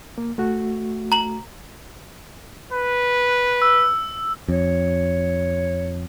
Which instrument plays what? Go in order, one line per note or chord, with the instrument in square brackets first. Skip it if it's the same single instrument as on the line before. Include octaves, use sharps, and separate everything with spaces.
[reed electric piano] A#3
A3 F#4
[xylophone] A#5 F#7
[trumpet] B4
[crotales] E6
[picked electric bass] F2 [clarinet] C#5